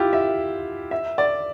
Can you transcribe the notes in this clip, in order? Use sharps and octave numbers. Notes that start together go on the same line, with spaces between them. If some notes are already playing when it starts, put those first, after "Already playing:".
Already playing: E4 F4 G4
E5
E5
D5